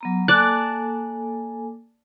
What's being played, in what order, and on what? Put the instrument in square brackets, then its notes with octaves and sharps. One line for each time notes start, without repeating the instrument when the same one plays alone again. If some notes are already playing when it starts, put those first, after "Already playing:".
[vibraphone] F#3 B3 A#5
[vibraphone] A#3 A4 G#5 [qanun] D5 A5 [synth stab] F#6